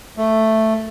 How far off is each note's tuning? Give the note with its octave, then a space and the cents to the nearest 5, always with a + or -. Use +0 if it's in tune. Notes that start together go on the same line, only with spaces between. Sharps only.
A3 +5